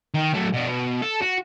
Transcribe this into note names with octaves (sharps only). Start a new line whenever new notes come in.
D#3
F#3 A3
B2 D4
B2
A4
F#4